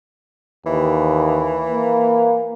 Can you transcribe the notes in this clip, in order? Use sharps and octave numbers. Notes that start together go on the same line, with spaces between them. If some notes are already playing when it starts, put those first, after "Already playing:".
D#2 E3
A#3